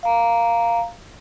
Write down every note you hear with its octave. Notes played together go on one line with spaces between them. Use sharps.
F5 A#5